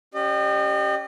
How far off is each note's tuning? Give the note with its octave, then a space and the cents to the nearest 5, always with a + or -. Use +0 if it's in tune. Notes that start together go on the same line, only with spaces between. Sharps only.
C#4 +0 G4 +0 D#5 -40